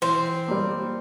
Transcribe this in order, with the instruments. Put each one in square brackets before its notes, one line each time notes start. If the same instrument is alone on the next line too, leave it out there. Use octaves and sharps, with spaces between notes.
[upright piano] E3 [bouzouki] C4
[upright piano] G3 A#3